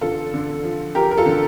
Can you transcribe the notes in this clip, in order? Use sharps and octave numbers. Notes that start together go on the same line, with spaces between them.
D3 F4 A4
D3
F3
F3 G4 A#4
A#4
F4 A4
D3